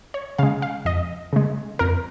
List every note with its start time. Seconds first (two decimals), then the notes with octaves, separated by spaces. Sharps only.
0.14 C#5
0.38 C#3 G#3 F5
0.62 F5
0.85 F2 D#5
1.33 C#3 G#3
1.79 F2 A#4